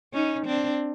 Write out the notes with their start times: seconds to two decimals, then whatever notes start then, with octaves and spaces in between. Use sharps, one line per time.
0.14 C#4 D#4
0.46 C4 D4